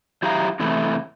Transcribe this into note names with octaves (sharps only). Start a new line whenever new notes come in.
F#3 E4 G4 E5 F5 A#5
E2 C3 E3 A3 E4